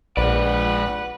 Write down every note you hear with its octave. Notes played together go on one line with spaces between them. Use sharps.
A#1 G#3 B4 D5 F#5